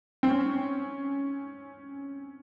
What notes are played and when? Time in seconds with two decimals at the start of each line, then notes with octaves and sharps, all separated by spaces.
0.23 C4
0.28 C#4